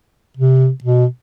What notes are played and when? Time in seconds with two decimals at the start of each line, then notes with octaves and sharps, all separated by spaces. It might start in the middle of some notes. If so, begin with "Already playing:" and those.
0.37 C3
0.84 B2